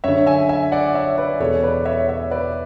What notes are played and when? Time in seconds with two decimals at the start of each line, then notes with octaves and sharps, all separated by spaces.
0.04 F#2 D3 C#5 E5
0.26 E5 G#5
0.49 E5 G#5
0.72 D5 F#5
0.94 C#5 E5
1.18 B4 D5
1.40 E2 B2 A4 C#5
1.63 B4 D5
1.85 C#5 E5
2.08 C#5 E5
2.31 B4 D5